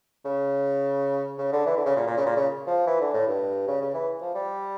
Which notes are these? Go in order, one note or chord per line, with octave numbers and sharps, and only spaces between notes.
C#3
C#3
D3
E3
D3
C#3
A#2
A#2
C#3
A#2
C#3
F3
E3
D3
A2
G2
C#3
C#3
E3
F3
G3